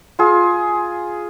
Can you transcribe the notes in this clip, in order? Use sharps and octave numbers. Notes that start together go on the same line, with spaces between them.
F4 G#4